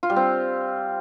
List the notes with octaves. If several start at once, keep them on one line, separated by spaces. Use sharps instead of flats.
F4
G3
C4